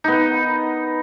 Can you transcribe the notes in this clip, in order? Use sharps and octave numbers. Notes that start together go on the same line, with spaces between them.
B3 D#4